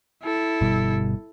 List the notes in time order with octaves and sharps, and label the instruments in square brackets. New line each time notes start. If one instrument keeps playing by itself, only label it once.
[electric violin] E4 A4
[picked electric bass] G1 B2 G3